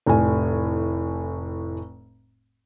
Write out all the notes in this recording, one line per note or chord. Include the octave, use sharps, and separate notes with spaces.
F1 A2 G#5